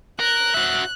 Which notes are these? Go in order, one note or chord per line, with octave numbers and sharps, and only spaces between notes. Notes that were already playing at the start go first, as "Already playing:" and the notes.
A#4 F#6
F#4 E5